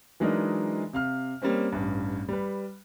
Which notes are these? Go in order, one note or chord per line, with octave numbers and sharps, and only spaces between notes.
E3 F#3 G#3 D4 D#4 A#4
C3 F5 F6
G3 A#3 C4 C#4
A1 G2
G3 B4